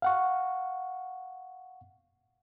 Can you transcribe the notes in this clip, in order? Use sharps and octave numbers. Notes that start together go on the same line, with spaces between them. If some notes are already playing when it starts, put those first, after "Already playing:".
F5 F#5 C#6